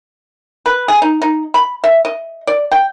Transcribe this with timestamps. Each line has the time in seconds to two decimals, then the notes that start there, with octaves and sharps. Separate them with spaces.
0.66 B4
0.88 G#4
1.02 D#4
1.22 D#4
1.54 B5
1.84 E5
2.05 D#5
2.47 D5
2.71 G5